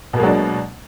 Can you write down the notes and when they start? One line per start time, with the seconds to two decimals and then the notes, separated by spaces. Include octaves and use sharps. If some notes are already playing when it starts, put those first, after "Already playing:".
0.13 B2
0.17 A#3
0.20 G#3
0.23 F#3
0.26 D4